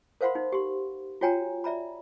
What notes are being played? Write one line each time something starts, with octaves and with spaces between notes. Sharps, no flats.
A#4 C5 F5 F#5 B5 C6
D#4
G4 C6
F4 F#4 C#5 G5 G#5 A#5
D5 E5 A#5 B5